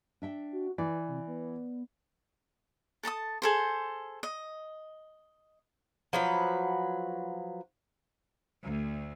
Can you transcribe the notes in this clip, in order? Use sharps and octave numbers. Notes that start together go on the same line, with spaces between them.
D4 E5 G5
F#4
E3 B4 D5
C3
B3
A4 A5 A#5 D#6
G#4 A4 C5
D#5
F3 F#3 B4
D2